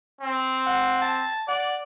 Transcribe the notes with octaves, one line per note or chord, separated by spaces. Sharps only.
C4
F#5
A5
D5 F#5